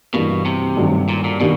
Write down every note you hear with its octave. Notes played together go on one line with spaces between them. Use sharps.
G2 B2 E3 G3 A#3
C3
G2 D#3 F#3 A3
A#2
A#2
B2 D#3 G3 A#3 D4